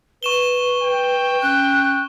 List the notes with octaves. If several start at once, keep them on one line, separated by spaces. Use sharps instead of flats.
B4 C#6 E7 G7
G5
C#4 F#6